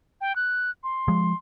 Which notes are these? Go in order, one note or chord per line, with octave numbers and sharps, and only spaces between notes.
G5
F#6
C6
F3 G#3